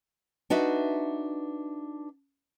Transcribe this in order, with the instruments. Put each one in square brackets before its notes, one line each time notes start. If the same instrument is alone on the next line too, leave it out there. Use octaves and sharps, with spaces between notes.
[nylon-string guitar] D4 D#4 F#4 B4 E5